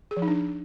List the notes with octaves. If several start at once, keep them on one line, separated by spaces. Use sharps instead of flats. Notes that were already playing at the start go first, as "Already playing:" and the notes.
G#4
F3
D#4
D4